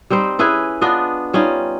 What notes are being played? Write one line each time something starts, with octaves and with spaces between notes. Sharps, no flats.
G3 C4 D#4 C5
C#4 E4 G#4 B4
B3 D4 F4 D#5
G3 C#4 D#4 F4